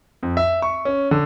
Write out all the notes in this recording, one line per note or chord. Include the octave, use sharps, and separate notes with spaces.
F2
E5
C#6
C#4
D3